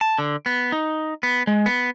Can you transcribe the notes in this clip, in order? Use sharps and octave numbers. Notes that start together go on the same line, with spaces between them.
A5
D3
B3
D#4
B3
G#3
B3